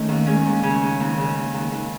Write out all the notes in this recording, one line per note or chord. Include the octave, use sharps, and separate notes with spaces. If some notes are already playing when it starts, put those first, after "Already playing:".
Already playing: D#3 A3 C#4
D#2
G#3 C#4
D#2
C#3 C#4
D#2
D#2 C4
C#3
D#2
D#2
D#2